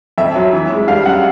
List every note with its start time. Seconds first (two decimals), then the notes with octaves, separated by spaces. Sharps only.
0.18 F2 E5
0.35 F#3
0.53 E3
0.70 G#3
0.88 G3 F5
1.06 F#2 F#5